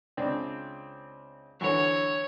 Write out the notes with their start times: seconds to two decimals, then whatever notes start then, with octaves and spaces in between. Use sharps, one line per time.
0.17 C#2 C4 D4
1.61 D3 E3 F#3 C#5